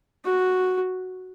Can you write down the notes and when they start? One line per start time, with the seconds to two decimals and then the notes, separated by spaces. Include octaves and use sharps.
0.25 F#4